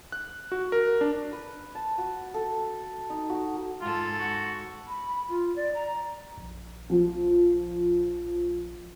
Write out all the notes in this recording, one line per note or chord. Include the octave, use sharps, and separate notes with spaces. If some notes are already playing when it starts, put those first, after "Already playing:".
F#6
F#4
A#4
D4
B4
A5
F#4
A4
D#4
F#4
G#2 F4 A4
F#4
B5
F4
D5
A#5
A#1
F3